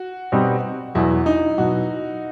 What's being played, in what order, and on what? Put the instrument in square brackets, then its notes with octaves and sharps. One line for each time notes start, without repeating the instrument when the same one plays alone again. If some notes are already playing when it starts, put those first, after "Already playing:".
Already playing: [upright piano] F#4
[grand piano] B2 G3 C4 D#4
[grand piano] E2 B2 F#3 [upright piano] E4
[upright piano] D#4
[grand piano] B2 F#3 [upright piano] F#4